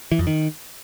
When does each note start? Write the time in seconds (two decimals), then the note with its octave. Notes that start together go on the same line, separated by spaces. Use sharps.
0.12 E3
0.19 F2
0.27 D#3